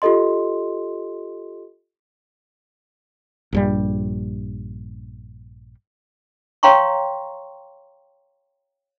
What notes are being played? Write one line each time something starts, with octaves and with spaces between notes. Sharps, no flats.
F4 G4 A4 D#5 C6
A#1 G2 G3
C#5 F5 G5 A#5 C6 C#6